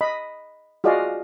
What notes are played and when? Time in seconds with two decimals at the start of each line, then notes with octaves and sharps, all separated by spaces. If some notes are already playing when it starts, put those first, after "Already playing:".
0.01 D#5 B5
0.84 F4 F#4 G#4 D5 D#5 F5